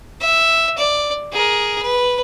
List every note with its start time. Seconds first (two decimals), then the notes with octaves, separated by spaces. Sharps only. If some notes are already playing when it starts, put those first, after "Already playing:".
0.21 E5
0.78 D5
1.32 G#4 A#4
1.82 B4